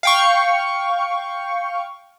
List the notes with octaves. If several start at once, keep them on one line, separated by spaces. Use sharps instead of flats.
F5 G5 C#6